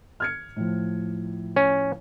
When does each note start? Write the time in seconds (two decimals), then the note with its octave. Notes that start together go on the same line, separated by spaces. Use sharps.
0.20 F6 G#6 C#7
0.56 A2 F3
1.56 C#4